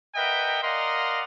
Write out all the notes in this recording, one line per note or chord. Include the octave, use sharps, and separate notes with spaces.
A#4 B4 D#5 E5 F#5 G5
A#4 D5 D#5 F5 F#5 C6